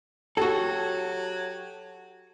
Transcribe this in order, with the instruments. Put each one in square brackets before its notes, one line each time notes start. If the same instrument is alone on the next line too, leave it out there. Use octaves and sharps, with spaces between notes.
[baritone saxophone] F#3 [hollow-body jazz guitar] F#4 A4 [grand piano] G4 A5